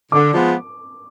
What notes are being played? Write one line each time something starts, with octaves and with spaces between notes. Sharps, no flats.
D3 D6
F3 G#3 B3